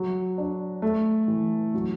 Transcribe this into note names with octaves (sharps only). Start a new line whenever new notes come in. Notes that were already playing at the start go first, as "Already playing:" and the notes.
Already playing: F#3
D4
A3
E3
F#3